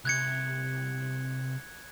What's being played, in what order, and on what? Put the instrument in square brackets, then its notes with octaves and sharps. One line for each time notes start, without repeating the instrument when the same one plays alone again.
[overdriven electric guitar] C2 [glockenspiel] F#6 G#6 C#7